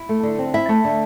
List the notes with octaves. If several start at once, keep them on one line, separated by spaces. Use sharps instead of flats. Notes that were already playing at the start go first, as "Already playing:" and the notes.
Already playing: E4
A3
D3
C4
E4 E5
A3
D3